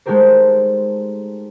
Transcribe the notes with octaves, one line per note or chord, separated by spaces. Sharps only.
G#3 A3 D#4 G4 A#4 C5